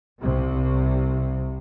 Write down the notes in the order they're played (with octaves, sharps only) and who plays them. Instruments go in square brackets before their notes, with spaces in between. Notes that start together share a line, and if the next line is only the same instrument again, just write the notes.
[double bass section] C2 C3